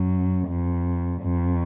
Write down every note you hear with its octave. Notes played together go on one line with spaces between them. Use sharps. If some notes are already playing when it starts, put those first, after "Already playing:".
Already playing: F#2
F2
F2